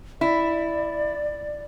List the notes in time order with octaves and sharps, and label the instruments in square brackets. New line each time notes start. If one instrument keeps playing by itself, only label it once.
[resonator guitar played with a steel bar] E4 [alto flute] D5